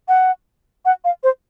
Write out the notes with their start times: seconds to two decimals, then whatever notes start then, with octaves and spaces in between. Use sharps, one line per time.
0.08 F#5
0.85 F#5
1.05 F5
1.23 C5